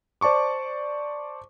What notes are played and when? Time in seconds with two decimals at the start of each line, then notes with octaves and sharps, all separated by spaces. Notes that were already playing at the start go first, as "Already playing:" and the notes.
0.21 C5 D5 A5 C#6 D6